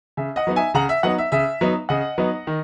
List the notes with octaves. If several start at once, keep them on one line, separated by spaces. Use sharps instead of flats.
C#3 E5
D#5 F#5
F#3 B3 D#4
E5 G#5
C#3 F#5 A#5
E5
F#3 B3 D#4 D#5 F#5
E5
C#3 E5
F#3 B3 D#4
C#3 D#5 F#5
F#3 B3 D#4
D#3